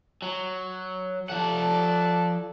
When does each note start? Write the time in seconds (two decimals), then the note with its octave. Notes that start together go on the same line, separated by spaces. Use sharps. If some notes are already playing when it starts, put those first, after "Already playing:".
0.22 F#3
1.30 F3 A4 D5 F#5